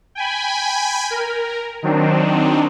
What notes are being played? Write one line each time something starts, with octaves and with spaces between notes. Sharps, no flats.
G5 G#5 B5
A#4
D#3 F#3 C4 D4 D#4